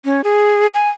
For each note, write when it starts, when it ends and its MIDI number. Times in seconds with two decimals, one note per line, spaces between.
0.05 0.21 61
0.24 0.67 68
0.74 0.89 80